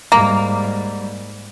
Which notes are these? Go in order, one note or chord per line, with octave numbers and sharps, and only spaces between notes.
G#2 G3 A#3